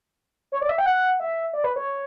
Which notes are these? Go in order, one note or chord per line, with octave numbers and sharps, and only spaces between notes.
C#5
D5
E5
G5
F#5
E5
D5
B4
C#5